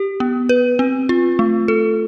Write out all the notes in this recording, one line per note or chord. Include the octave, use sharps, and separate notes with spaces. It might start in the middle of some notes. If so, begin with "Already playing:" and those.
Already playing: G4
B3
B4
C4
F4
A3
A4